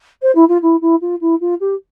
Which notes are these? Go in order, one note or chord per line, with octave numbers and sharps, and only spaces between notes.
C5
E4
F4
E4
E4
F4
E4
F4
G4